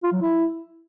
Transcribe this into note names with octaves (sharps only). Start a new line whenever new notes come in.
F4
F#3
E4